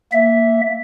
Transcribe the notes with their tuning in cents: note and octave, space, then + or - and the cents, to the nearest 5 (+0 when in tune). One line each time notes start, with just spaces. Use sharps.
A#3 -10 E5 +0